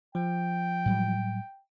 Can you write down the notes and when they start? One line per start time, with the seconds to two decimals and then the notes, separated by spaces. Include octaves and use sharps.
0.15 F3 G5
0.86 A2 F#3 G3